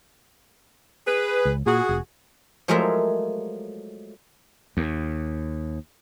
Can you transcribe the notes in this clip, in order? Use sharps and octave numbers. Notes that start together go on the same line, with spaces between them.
G#4 B4
C#2
A#2 F#4 G#4
F1
F3 F#3 G#3 A3 A#4 E5
D#2